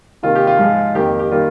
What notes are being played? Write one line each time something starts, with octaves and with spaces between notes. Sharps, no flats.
C3 D#3 A#3 F4
G4
F4
G#2 F3 G#3
F2 D#3 A#3 G4
G4
D#3 G3 A#3 F4